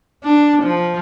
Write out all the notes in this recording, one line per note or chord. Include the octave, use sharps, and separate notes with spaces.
D4
F3